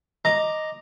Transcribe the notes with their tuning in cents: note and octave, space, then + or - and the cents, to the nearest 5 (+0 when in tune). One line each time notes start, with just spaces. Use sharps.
D#5 +0 A#5 +0 D6 +5